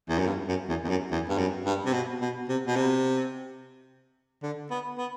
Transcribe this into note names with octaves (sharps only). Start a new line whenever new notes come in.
E2
F#2
G2
F#2
E2
E2
F#2
E2
G2
F#2
G2
C3
B2
B2
C3
B2
C3
D3
B3
B3